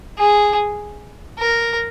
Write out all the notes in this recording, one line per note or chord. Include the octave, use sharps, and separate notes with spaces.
G#4
A#4